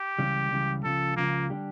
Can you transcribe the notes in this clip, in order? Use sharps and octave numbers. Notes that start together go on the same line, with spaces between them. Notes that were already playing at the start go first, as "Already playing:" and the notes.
Already playing: G4
C#2 C#3 E3 G3
C#2 C#3 E3 G3
C#2 C#3 F3 A4
C#2 C#3 F3 A#3
D3 G3 D4 G4